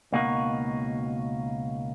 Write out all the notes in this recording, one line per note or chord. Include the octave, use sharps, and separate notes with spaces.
C#2 B2 A#3 D#4 F#4